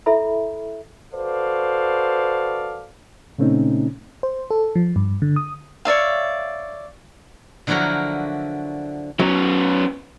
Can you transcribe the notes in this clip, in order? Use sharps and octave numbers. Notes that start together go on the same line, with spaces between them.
E4 A4 E5 B5
F#4 A4 B4 C5 D5 F5
A#2 C#3 A3 C4 C#4 D#4
C5
A4
F3
G2
D3
D#6
C#5 D5 E5 F5
D3 F3 F#3 E4 F#4 A#4
F#3 B3 C#4